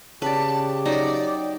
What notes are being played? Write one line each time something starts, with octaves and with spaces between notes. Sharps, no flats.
C#3 G4 B4 D5 A5
F#3 D#4 D5